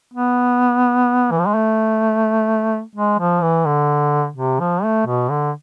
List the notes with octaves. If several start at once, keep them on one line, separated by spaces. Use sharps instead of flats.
B3
E3
F3
G#3
A3
G#3
F3
E3
D3
C3
F3
A3
B2
D3